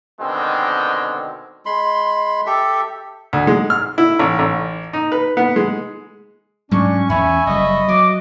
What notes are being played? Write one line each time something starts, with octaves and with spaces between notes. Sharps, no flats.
B2 D3 D#3 G#3 C4
G#3 B5 C6
G4 A4 E5
D2
G#3
F6
E4
A1
A1
D#4
B4
B3
G#3
G#2 F#3 G#3 C#4 D4 C#6
E2 A3 C#4 E5 G#5 B5 C#6
F#1 G3 D#5
F#3 F#4 D6